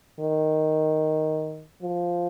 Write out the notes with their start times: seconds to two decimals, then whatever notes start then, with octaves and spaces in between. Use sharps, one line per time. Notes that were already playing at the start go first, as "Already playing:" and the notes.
0.20 D#3
1.82 F3